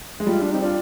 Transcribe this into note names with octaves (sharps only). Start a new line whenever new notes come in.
G#3
G3 F4
D4
C4 D#4
D4 F4